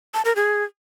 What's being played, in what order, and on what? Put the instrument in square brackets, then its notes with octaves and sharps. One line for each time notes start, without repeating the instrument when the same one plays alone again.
[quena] A5
A#4
G#4